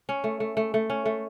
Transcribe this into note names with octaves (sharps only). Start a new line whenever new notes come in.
C#4
A3
A3
A3
A3
C#4
A3